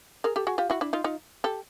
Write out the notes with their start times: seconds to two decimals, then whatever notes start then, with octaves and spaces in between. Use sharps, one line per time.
0.24 G#4 A#4
0.36 G4 A4
0.47 F#4 G#4
0.58 F4 G4
0.70 E4 F#4
0.81 D4 E4
0.93 D#4 F4
1.04 D#4 F4
1.44 G4 A4